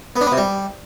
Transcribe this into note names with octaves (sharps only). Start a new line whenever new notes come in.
B3
D4
B3
C3
G3